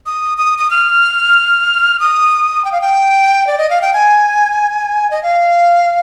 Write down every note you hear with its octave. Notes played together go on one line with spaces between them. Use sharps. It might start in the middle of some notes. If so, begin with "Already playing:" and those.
D#6
D#6
D#6
F6
D#6
G5
F5
G5
D5
D#5
F5
G5
G#5
D#5
F5